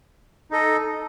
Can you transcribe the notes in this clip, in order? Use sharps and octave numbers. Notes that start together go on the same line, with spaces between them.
D#4 A4 D#5